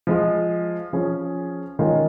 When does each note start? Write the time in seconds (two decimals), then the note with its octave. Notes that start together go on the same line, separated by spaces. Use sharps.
0.07 F3 G#3 F4
0.93 F3 C#4 G#4
1.79 D#3 G#3 C#4 F4 G#4